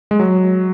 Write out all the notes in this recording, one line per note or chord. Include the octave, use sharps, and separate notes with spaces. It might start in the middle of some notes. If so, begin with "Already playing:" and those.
G#3
F#3